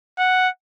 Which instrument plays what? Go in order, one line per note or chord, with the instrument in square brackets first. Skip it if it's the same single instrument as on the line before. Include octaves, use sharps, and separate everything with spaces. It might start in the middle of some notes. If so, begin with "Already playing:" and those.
[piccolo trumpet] F#5